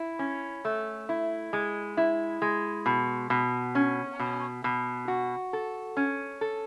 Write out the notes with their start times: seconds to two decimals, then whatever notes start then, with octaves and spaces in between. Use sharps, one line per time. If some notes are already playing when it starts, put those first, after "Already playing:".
Already playing: E4
0.19 C#4
0.65 A3
1.09 E4
1.53 G#3
1.97 E4
2.42 G#3
2.86 B2
3.30 B2
3.75 C#4
4.19 B2
4.64 B2
5.08 F#4
5.53 A4
5.97 C#4
6.41 A4